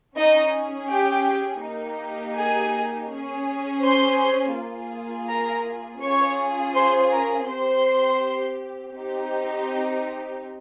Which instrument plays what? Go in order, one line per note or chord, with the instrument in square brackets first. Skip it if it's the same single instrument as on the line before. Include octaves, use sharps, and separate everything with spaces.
[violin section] C#4 D#4 G#4 D#5
G4 G5
A#3 D#4 G4
G#4 G#5
C#4 G#4
C5 C6
A#3 F4 G#4
A#4 A#5
C#4 F4 G#4 C#5 C#6
C5 C6
A#4 A#5
C4 G4 C5 C6
C4 D#4 G4